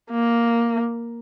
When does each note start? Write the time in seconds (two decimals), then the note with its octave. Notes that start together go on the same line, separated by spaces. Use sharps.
0.11 A#3